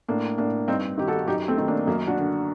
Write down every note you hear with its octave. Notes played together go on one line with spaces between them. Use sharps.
A2 A#3 D4
A2 A#3 D4
G2 C4 D#4
D#3 G4
F#4 A4
F#2 D#4 G4
A3 C4
D#3
A#3 D4
F#2 A#3
D4 F#4
D3